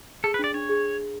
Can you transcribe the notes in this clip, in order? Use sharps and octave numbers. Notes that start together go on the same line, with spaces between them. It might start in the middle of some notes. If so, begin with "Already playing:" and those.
G#4 A4
B4
D4 D5
D4 C#5
G#4